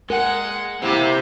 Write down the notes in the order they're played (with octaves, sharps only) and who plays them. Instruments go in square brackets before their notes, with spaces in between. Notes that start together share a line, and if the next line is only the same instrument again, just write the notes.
[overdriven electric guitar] G#3 [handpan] A#4 [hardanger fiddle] F#5
[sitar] C3 A#3 G4 [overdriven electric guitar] C4 E5 [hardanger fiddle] E4